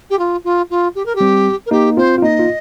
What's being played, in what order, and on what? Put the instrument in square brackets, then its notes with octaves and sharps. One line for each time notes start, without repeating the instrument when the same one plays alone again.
[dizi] G4
F4
F4
F4
G4
A#4
G4
[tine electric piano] G3 C4
[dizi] A#4
[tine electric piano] A#3 D#4 [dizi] G4
[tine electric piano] C4 F4 [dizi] C5
[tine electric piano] F4
[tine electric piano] A#3 D#4 [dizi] D#5
[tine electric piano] F4